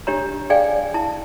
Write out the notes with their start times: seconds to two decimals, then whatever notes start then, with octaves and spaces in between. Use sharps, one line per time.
0.07 D4 G4 C#5 A#5
0.50 G#4 D5 F5 G5 G#5
0.94 E4 A5